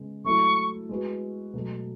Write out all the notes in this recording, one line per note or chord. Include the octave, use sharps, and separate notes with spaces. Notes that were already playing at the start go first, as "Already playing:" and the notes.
Already playing: C#3 G#3 B3
F#3 A3 E4 C#6
G#3 B3 F#4
B2 F#3 A3